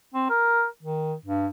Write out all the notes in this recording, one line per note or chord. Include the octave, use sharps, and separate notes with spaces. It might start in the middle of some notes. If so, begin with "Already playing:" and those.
C4
A#4
D#3
G2